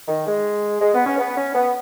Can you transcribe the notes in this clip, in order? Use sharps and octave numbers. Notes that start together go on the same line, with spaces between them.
D#3
G#3
G#3
B3
C#4
B3
C#4
B3